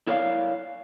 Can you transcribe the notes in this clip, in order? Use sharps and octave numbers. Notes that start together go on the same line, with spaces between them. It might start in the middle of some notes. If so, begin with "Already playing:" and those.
E4 A#4 C#5 D5 F5